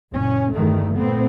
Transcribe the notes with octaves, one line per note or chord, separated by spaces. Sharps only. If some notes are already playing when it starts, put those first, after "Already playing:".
F#1 A#2 C#4
G1 E2 G2 D#3 A3
A#2 A3 B3 C4